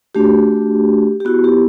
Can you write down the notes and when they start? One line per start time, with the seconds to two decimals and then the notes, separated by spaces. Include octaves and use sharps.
0.15 A3 D4 F#4 G4
1.20 G4
1.25 B3 E4 F#4
1.44 G4